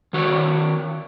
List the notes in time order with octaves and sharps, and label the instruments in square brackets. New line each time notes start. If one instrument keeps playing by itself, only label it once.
[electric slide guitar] D#3 F#4 A#4 C#5 D5